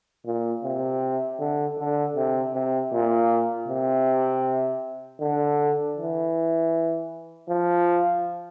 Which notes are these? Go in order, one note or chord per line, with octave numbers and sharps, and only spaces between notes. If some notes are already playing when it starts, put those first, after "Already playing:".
A#2
C3
D3
D3
C3
C3
A#2
C3
D3
E3
F3